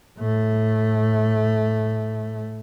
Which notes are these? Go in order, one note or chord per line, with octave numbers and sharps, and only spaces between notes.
A2 A3